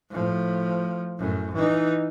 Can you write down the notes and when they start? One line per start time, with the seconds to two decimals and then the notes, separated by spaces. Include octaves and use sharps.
0.10 A2 F3
1.19 F#2 A2
1.54 E3 D#4